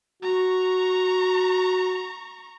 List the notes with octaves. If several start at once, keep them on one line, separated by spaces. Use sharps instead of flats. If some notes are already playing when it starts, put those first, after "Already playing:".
F#4 A#5 C#6